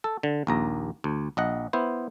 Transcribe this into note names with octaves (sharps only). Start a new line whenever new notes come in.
A4
D3
A#1 D#2 A#5
D2
A#1 D#5 F#5
B3 E4 C5